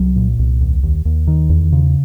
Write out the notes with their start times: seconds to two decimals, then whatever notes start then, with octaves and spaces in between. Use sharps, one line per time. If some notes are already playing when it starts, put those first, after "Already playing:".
Already playing: C2 F#3
0.16 A#2
0.39 C2
0.61 D#2
0.83 D#2
1.05 D#2
1.27 D#3
1.49 E2
1.72 C#3